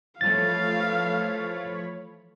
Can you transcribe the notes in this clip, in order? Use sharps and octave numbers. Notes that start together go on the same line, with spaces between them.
E3 F3 A3 C#5 F5 B5 A6